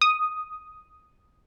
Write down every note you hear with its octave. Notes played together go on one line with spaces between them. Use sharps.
D#6